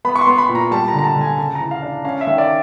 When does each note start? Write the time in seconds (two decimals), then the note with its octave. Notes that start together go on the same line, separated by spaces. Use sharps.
0.05 B3 B5
0.16 C#6
0.21 C6
0.27 B3
0.38 B5
0.49 A#2
0.55 A#5
0.71 G3 A5
0.88 A#5
0.93 D3
0.99 A#5
1.04 A5
1.15 D3
1.21 G#5
1.38 C#3 A5
1.55 A#5
1.60 E3
1.71 F5
1.82 D4
2.04 C#4 F5
2.21 E5
2.27 D#3
2.38 D5